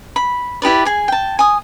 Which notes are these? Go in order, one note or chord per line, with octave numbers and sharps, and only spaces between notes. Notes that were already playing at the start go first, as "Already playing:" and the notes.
B5
E4 G4 B4 D5
G#4 G#5
G5 A5
G#5 D#6